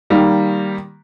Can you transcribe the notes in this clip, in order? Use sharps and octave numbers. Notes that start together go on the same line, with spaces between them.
D#3 G3 A#3